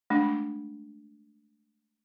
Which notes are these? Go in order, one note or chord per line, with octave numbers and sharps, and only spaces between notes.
G#3 A3 D4